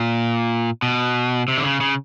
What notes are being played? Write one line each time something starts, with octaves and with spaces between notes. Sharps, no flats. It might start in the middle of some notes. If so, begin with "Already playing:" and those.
Already playing: A#2
B2
C3
D3
C#3
C#3